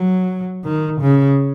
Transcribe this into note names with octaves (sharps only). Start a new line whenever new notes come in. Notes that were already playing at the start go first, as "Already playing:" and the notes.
Already playing: F#3
D#3
C#3